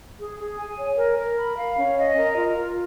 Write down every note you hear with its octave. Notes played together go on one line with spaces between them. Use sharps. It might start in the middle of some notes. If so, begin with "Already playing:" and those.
G#4
G#4
G#5
C#5
A#4
A#4
B5
F5
C#4
D#5
A#4
F4
F4